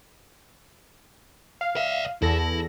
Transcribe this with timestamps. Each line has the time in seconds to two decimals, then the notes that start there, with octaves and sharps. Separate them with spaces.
1.61 F5
1.76 D5 E5
2.22 E2 E4 A4 A#6